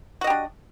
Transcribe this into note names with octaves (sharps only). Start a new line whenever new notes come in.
D4 F#4 G4 D#5